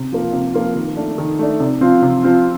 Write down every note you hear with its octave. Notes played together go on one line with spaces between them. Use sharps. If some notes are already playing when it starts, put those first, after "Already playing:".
Already playing: C3
F3 A#3 F4
C3
F3 A#3 F4
D#3
A3 D4
D#3
A3 D4
C3
F3 C4 F4
C3
F3 C4 F4